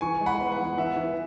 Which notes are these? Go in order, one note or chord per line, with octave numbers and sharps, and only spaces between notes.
E3 G#5 C#6
G#3
F#5 B5
B3
F#5
E3
E3 E5
E3